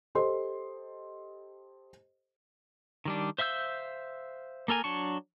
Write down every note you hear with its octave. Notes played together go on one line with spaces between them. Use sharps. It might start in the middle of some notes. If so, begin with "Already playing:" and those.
G4 A4 C5 D#5 C6
D#3 G3 D4
C5 E5 F5 E6 G6
A#3 A4 A#4 G#5
F#3 D4 A5 C#6